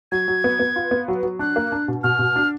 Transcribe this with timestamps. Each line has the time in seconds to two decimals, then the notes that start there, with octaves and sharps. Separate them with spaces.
0.12 F#3 G#6
0.28 F#3
0.44 B3
0.59 B3
0.76 F4
0.91 B3
1.08 F#3
1.23 F#3
1.39 D4 F#6
1.56 A#3
1.72 D4
1.88 B2
2.03 B2 F6
2.19 B2
2.36 D4